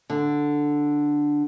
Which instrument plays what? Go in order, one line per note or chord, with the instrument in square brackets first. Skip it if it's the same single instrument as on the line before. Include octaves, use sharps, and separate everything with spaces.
[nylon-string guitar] D3